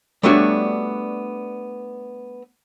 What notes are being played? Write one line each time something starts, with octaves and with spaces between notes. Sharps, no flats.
G3 A3 B3 D4 F#4 C#5